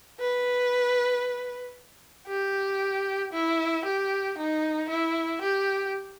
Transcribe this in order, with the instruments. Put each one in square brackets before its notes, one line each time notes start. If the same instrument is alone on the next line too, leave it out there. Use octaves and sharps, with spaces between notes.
[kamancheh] B4
G4
E4
G4
D#4
E4
G4